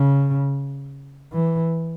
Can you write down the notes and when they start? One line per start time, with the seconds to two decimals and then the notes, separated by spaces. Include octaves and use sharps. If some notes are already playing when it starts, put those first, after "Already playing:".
Already playing: C#3
1.32 E3